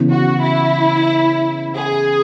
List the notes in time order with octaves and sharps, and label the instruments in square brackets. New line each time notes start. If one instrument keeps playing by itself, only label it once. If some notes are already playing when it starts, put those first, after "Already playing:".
Already playing: [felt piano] C#3 E3 B3
[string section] F#4
E4
G#4